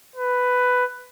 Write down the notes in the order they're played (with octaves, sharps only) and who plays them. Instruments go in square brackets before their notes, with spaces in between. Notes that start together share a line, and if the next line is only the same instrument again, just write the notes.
[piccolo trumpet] B4